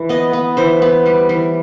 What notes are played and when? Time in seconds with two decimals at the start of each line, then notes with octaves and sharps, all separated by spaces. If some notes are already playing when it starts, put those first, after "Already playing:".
Already playing: E3
0.09 B3 D#5
0.33 B3
0.57 E3 C5
0.82 B3
1.06 G3
1.29 E3